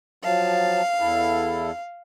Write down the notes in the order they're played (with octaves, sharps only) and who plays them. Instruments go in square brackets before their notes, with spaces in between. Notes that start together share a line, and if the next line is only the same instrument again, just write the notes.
[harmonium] F3 F#3 A5 [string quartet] F5
[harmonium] E2 E4 A4